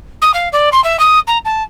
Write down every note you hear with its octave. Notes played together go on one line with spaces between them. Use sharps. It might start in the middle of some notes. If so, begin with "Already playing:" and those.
D#6
F5
D5
C6
E5
D#6
A#5
A5